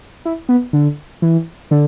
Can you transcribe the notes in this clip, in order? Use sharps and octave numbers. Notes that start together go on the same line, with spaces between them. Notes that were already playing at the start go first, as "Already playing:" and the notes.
E4
B3
D3
E3
D3